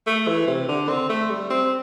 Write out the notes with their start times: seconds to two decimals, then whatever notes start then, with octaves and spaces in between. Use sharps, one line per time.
0.06 A3
0.27 E3
0.47 C3
0.68 D3
0.88 C4
1.09 A3
1.30 G3
1.50 C4